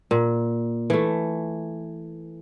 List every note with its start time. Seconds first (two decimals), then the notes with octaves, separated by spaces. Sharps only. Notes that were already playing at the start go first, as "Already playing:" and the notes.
0.11 A#2
0.90 E3 A3